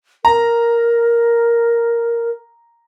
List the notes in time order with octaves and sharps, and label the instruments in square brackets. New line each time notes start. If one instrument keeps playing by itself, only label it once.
[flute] A#4 [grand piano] A#5